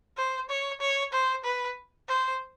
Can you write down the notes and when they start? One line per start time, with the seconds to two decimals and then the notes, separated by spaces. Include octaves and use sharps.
0.17 C5
0.50 C#5
0.81 C#5
1.13 C5
1.44 B4
2.08 C5